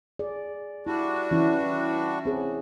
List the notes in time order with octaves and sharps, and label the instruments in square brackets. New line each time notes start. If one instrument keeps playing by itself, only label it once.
[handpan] G#4 D5
[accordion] G3 D4 F#4 [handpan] E4
[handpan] E3 C#4 E4
C4 G#4 C#5